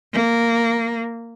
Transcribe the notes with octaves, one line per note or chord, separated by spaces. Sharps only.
A#3